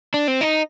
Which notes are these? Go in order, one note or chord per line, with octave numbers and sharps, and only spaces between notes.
D4
C4
D#4